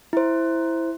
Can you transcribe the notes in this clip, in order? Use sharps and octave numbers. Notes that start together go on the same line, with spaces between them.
E4 C5